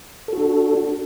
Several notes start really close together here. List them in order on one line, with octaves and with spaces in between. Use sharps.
A4 F#4 D4